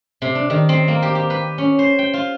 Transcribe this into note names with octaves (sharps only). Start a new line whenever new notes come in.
C3
D4
D#3
C4
A#3
G4
G4
B4
C#4
C5
G5
F4